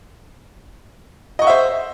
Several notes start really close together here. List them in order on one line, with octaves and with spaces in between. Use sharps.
D#5 C#6 F#5 E5 C5